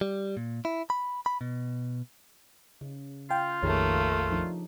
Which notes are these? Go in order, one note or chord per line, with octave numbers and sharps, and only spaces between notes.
G3
A#2
E4
B5
B5
B2
C#3
F4 F5 G5
A#1 F2 D#3 A3 A#3 G4 G#4 C#5
F3 D4 D#4